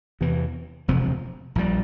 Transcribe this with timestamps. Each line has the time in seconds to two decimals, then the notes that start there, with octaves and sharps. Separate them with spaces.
0.21 E2 C3 E3
0.88 E1 D2 C3 F3
1.55 A#1 A#2 G3